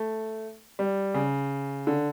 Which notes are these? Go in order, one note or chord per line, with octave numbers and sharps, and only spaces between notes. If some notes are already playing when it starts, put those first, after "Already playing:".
Already playing: A3
G3
C#3
D3